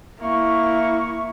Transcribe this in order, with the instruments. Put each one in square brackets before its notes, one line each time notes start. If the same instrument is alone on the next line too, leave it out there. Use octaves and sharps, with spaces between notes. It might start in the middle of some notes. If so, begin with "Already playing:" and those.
[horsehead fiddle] A#3 E4 [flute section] E5 C#6